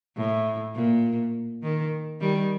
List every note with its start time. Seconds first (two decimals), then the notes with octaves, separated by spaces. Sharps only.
0.17 A2
0.75 A#2
1.63 D#3
2.21 D#3 G3